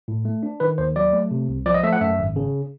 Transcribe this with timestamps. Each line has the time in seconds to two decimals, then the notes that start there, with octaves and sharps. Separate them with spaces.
0.08 A2
0.25 A3
0.43 D4
0.60 D#3 B4
0.78 D#2 C5
0.96 F#3 D5
1.13 A3
1.31 C3
1.49 C2
1.66 F3 D5
1.74 D#5
1.84 A3 E5
1.93 F#5
2.01 F#2 E5
2.19 G#1
2.36 C#3